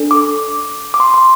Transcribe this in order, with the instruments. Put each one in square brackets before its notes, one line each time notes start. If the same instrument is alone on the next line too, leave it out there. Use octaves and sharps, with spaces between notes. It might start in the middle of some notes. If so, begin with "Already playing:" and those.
Already playing: [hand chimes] D4 A4
D6
D6
C6
C6